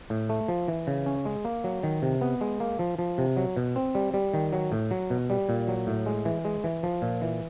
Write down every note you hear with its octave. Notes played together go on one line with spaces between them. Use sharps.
A2
A3
F3
E3
C#3
C#4
G#3
A#3
F#3
D#3
C3
B3
G#3
A#3
F3
F3
C3
F#3
B2
C4
G3
G3
D#3
F#3
A2
F#3
B2
G3
A#2
F#3
A2
G#3
E3
G#3
E3
F3
A#2
E3